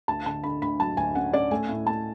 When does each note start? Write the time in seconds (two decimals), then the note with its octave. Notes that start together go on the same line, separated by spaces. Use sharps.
0.08 D2 A5
0.26 D3 A5
0.44 D3 B5
0.62 D2 B5
0.80 F#3 A5
0.97 D2 G#5
1.15 C#4 F#5
1.33 C#4 D5
1.51 A3 G#5
1.69 A2
1.87 A2 A5